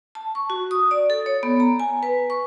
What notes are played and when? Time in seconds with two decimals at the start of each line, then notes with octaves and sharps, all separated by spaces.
0.15 A5
0.35 C#6
0.50 F#4
0.71 D#6
0.91 D5
1.10 A4
1.26 C#5
1.43 B3
1.60 A#5
1.80 G#5
2.03 B4
2.30 C#6